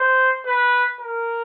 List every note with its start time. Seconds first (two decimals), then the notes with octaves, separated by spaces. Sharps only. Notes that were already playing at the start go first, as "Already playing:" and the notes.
Already playing: C5
0.46 B4
1.01 A#4